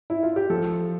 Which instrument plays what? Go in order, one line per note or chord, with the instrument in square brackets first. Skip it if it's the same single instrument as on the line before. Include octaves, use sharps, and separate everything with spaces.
[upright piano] E4
F4
G4
[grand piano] F3 [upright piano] A4